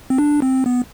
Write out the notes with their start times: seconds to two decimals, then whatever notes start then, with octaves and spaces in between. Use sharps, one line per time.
0.10 C4
0.18 D4
0.42 C4
0.66 B3